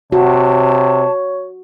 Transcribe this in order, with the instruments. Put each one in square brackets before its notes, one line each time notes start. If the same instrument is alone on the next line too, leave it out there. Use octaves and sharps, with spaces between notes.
[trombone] C3 [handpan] F#4 [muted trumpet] C#5 [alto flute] A5